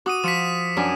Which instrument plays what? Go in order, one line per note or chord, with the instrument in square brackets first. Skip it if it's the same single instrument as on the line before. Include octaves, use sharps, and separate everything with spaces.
[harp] F#4 [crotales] D6 D#6 D#7
[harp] F3 [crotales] B6 C#7 E7
[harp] F#2 D4 G#5